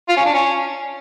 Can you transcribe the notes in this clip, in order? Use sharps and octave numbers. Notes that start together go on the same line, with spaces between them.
F4
C#4
D4
C#4